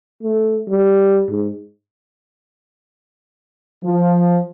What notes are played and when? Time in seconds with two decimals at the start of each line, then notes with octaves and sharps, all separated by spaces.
0.23 A3
0.69 G3
1.30 G#2
3.83 F3